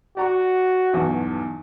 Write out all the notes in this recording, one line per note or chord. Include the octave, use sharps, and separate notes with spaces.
F#4 D5 A#5 C#6
B1 E2 G2